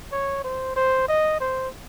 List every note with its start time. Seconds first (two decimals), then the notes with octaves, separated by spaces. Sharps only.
0.12 C#5
0.44 C5
0.76 C5
1.08 D#5
1.40 C5